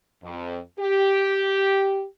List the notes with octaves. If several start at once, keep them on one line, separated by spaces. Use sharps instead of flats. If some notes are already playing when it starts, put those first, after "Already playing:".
F2
G4